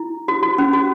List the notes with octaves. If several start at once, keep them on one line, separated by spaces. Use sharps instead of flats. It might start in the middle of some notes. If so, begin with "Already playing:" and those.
Already playing: E4
F#4
F#4
C#4
F#4